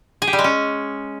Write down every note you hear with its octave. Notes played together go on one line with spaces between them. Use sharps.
G#4
G4
G3
G#3
C#4